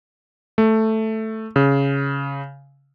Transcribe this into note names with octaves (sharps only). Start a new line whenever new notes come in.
A3
C#3